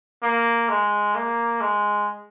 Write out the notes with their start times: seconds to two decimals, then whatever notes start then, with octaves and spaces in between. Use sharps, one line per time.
0.23 A#3
0.69 G#3
1.15 A#3
1.61 G#3